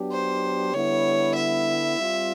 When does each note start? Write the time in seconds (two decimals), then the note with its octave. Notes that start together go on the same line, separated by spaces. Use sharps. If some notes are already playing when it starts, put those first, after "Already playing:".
Already playing: F#3 B3 D4 G4
0.12 C5
0.74 D3 G3 B3 E4 C#5
1.35 E5
1.97 G3 C4 F4